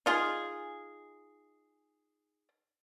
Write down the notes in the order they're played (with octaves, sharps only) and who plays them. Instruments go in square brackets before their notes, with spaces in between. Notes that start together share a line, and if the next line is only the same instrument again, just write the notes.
[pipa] D#4 F4 G#4